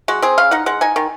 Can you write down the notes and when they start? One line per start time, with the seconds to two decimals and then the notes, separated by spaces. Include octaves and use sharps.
0.08 G#3 F#4
0.22 C4 G#4
0.38 C#3 F5
0.51 D#4 F#5
0.66 G#3 F#5
0.81 D#4 G#5
0.96 D#3